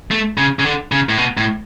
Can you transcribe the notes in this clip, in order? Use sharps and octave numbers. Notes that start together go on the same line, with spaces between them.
A3
C#3
C#3
D3
C#3
A2
B2
A2